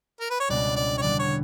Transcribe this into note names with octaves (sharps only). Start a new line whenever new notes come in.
A#4
B4
C#5
C#2 B2 G3 B3 D4 D5
D5
C#5
E2 D3 G3 B3 D4 D5
C#5